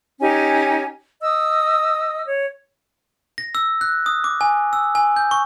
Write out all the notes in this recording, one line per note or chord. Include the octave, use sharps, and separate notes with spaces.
C#4 D#4 G4 G#5
D#5 D#6 E6
C#5
A#6
E6
F#6
D#6
D6
G#5
E6
G#5
G6
C#6